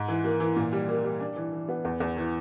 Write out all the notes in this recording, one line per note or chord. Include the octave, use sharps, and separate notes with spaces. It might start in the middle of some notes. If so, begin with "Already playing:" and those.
Already playing: G#2
E3
A#3
E3
A#2
G3
A#3
G3
D4
E3
E3
B3
E2
E2
E3